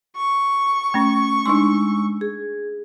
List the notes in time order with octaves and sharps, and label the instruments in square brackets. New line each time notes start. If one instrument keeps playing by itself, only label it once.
[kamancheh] C#6
[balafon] A3 C#4
[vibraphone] G#3 E6 [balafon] D4 D#4 C6
[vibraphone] G#4